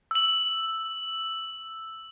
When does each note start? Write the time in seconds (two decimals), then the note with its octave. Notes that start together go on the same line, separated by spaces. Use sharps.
0.11 E6 F#7